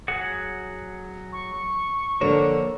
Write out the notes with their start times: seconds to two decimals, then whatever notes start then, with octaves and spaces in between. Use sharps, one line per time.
0.08 F#3 G#4 F#5
1.32 C#6
2.21 D3 F3 A#3 C#5